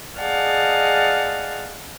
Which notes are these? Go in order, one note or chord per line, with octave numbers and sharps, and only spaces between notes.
G#4 D5 D#5 F5 F#5 A5